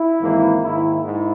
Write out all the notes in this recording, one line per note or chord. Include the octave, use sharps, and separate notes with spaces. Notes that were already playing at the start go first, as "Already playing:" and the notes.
Already playing: E4
G#1 G#2 E3 A#3
G#2 D#3 A#3 E4
G#2 E4